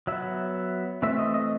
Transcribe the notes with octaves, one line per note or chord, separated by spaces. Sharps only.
F#3 B3 E5
E3 A3 C4 E5
D#5
D#5